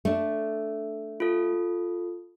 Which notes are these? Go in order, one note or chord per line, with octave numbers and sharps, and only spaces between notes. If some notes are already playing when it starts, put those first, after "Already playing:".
A3 D4
F4 A4